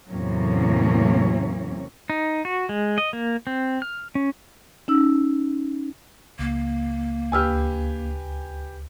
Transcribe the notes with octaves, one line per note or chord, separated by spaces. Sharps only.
E2 A2 C3 F#3 A#3 C#4
D#4
F#4
G#3
D#5
A#3
C4
F6
C#4
C#4 D#4 E6
C#2 A#3
D2 G4 B4 G#5 E6 F6